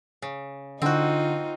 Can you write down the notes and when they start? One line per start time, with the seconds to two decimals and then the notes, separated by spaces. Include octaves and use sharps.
0.22 C#3
0.82 D3 C4 D#4 F4 F#4